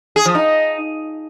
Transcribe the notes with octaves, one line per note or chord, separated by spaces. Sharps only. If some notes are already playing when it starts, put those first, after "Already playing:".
G#4
F3
D#4